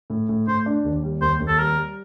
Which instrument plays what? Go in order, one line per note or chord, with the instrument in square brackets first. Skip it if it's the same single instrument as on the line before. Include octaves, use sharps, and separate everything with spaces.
[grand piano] A2
A2
[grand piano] A2 [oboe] C5
[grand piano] D4
D#2
G3
[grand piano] D#2 [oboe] C5
[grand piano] D#2
[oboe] A4
[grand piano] G3 [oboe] A#4
[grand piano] G3